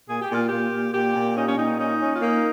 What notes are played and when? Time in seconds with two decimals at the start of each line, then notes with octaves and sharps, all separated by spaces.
0.07 A#2 G#4
0.21 G4
0.29 A#2 F4
0.46 A#2 G4
0.71 A#2
0.93 A#2 G4
1.14 A#2
1.35 C#4 D#4
1.47 C#4
1.57 A#2 D#4
1.78 C#4 D#4
2.00 C#4
2.12 F4
2.21 A#3 D#4